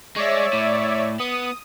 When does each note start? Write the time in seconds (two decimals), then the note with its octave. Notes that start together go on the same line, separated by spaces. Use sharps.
0.16 G#3 C#5 D5 E5
0.53 A2
1.20 B3 D#6